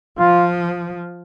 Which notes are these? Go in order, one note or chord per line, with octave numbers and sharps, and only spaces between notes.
F3 F4